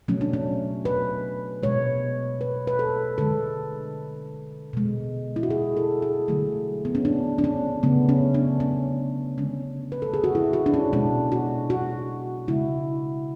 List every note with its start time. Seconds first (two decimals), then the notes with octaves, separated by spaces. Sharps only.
0.08 B2 F#3 A3 C#4
0.21 D4
0.33 C#4
0.85 B4
1.63 B2 G#3 C#5
2.41 B4
2.67 B4
2.79 A4
3.18 D3 G#3 A4
4.73 B2 G#3
5.36 E4
5.43 F#4
5.50 G#4
5.77 A4
6.02 G#4
6.28 D3 F#3 A3
6.85 B3
6.95 C#4
7.05 D4
7.38 D4
7.44 C#4
7.83 C#3 F#3 A3 B3
8.09 C#4
8.34 D4
8.60 C#4
9.38 D3 G#3 C#4
9.92 B4
10.02 A4
10.14 G#4
10.24 F#4
10.35 E4
10.53 F#4
10.66 D4
10.74 C#4
10.93 B2 G#3 D4
11.32 F#4
11.70 F#4
12.48 C#3 G#3 E4